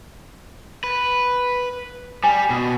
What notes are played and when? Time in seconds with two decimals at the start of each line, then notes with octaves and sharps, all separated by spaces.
0.84 B4
2.24 G3 G#5
2.50 B2